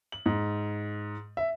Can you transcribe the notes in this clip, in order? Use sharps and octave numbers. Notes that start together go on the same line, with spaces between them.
F#7
G#2
E5